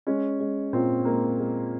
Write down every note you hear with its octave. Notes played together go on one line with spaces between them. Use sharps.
G#3 C#4
G#3
A#2 C4
G#3 A#3
G#3